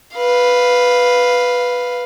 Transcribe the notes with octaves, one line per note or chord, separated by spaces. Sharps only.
B4 F5